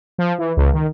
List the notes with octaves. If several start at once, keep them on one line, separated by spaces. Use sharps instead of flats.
F3
E3
C#2
D#3